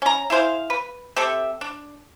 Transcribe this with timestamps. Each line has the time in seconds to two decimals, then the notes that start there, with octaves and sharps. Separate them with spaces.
0.02 C#4 A#5
0.30 E4 G#4 C5 F5
0.70 B4
1.16 C4 G4 A4 E5
1.61 D4